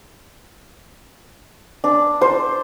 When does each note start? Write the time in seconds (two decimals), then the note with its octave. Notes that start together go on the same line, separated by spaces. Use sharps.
1.84 D4
2.21 C5